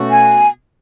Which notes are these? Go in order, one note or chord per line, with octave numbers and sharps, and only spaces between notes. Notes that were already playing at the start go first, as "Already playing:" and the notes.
Already playing: B2 A3 C#4 F#4
G#5